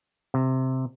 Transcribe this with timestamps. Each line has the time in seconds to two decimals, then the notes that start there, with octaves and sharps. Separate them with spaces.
0.34 C3